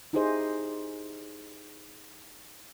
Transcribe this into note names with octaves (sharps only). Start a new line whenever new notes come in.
D#4 E4 G4 G#4 C5 D#5